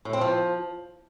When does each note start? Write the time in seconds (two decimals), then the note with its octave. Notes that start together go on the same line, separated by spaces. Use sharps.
0.05 A2
0.13 C4
0.21 F3